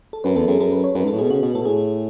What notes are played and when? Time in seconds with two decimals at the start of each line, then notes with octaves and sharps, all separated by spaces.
0.13 A4
0.24 F#2 B4
0.36 E2 A4
0.48 F#2 G#4
0.59 F#2 A4
0.72 B4
0.84 C#5
0.95 F#2 B4
1.04 G#2
1.08 A4
1.13 A2
1.19 B2 G#4
1.30 C#3 F#4
1.42 B2
1.54 A2 A4
1.62 B2
1.65 A2 G#4